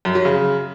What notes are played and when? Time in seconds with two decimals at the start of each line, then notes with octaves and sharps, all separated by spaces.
0.05 F#2
0.15 F#3
0.25 C#3